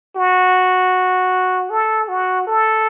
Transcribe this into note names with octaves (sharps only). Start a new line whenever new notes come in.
F#4
A4
F#4
A4